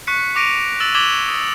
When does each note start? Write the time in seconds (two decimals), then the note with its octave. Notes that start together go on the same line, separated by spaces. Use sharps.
0.07 C#6 F#6 B6 C#7
0.35 C#6 D6 A#6 D7 D#7 F7
0.80 E6 A6 E7 F#7
0.94 D6 G#6 B6 E7 F#7 G7
1.28 D#6 E6